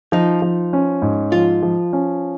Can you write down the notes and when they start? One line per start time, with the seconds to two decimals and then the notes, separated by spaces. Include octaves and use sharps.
0.12 F3 D#4
0.42 F3
0.73 C#4
1.02 G#2
1.32 F3 F4
1.63 F3
1.93 C#4